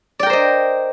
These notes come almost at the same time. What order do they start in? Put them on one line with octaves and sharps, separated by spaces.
D5 G5 A#4 C5 D#5